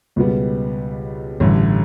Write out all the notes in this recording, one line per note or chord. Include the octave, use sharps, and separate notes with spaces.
C#2 B2 G3 B3
A1 G2 D3